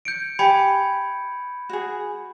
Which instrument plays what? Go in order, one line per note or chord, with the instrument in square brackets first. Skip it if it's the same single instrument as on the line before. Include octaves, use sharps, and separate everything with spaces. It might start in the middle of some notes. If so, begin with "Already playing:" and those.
[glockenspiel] G6 C#7 D7
[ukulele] G4 G#5 [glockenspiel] B5 G#6 C#7
[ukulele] F#4 G#4